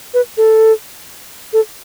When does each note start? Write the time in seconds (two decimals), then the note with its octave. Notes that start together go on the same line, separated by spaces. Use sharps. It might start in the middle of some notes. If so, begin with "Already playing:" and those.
0.14 B4
0.37 A4
1.53 A4